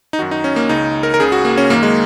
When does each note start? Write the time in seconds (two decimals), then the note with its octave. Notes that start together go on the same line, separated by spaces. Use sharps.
0.13 D#4
0.19 F#2 D#3 F#4
0.31 D#4
0.44 C#4
0.56 A#3
0.69 C#2 C#3 D#4
1.03 A#4
1.14 A#4
1.20 C#2 C#3 G#4
1.32 F#4
1.45 A#3
1.58 C#4
1.70 F#2 D#3 A#3
1.83 G#3